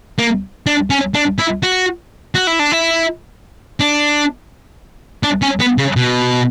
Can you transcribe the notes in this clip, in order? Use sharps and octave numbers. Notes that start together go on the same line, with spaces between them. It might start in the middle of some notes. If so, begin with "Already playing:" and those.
A#3
D4
C#4
D4
E4
F#4
F#4
E4
D4
E4
D4
D4
C#4
B3
C#3
B2